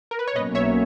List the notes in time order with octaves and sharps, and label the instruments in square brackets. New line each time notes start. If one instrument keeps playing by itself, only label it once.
[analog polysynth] A#4
B4
C#5
[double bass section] B1 B2 A#3 C#4 [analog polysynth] B4 D#5
[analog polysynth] C#5 E5